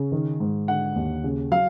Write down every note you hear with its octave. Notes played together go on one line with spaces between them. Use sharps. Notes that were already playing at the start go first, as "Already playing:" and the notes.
Already playing: C#3
D#3
G#2
D3 F#5
D#2
C#3
F#3 F5